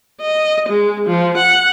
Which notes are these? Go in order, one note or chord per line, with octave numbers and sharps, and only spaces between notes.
D#5
G#3
F3
F#5